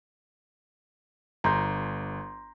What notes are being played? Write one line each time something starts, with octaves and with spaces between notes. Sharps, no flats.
G1 A#5 C6 G6